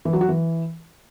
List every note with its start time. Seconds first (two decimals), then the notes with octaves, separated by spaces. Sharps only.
0.05 E3
0.13 F#3
0.21 F#4
0.29 E3